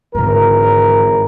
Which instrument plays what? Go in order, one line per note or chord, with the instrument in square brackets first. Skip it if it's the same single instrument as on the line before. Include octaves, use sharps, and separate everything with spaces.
[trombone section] G#1 E3 A#4 [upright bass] G#2 D3